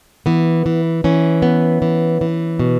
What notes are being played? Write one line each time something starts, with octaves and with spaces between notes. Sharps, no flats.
E3 B3
E3
E3 C#4
B3
E3
E3
B2